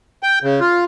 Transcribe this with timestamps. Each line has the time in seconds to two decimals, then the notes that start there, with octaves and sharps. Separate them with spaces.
0.23 G5
0.43 C#3
0.60 F4